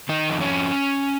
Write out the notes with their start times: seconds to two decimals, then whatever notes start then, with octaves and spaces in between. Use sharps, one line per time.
0.09 D#3 D#4
0.30 F2
0.41 C#4